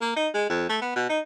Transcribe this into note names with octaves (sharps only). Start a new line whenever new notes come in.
A#3
D#4
G#3
F2
A3
B3
B2
D#4